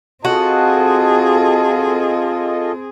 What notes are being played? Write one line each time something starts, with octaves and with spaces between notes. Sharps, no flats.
C4 F4 F#4 G#4 A4 D#5 A5